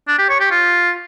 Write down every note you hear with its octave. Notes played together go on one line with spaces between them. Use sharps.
D4
G4
C#5
G4
F4